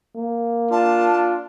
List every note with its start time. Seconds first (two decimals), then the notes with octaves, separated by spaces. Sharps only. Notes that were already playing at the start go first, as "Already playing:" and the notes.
0.16 A#3
0.72 D4 F4 A5